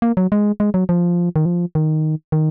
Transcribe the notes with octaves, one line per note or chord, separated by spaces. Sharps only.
A#3
F#3
G#3
G#3
F#3
F3
D#3
F3
D#3
D#3